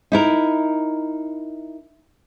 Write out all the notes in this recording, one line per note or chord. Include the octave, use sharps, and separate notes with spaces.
D#4 E4 A#4